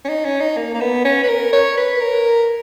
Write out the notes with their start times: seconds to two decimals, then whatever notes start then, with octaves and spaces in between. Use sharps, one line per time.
0.04 C#4
0.09 D#4
0.25 C#4
0.41 D#4
0.57 A#3
0.74 A#3
0.81 B3
1.05 C#4
1.23 B4
1.29 A#4
1.53 C#5
1.77 B4
2.00 A#4